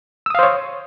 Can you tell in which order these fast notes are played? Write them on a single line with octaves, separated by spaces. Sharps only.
E6 D#6 F5 C5 C#5